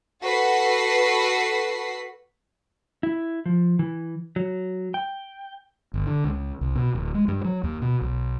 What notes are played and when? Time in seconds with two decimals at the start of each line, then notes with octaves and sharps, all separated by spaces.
0.22 F#4 A4 B4 F#5 B6 C7
3.03 E4
3.46 F3
3.79 E3
4.36 F#3
4.94 G5
5.94 G1
6.07 D3
6.24 C#2
6.61 C2
6.75 B2
6.95 D1
7.14 G#3
7.28 G2
7.45 F#3
7.63 D#2
7.82 B2
8.01 B1